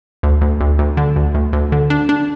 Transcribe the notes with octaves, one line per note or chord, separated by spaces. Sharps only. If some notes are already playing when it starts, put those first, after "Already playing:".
D2
D2
D2
D2
D3
D2
D2
D2
D3
D4
D4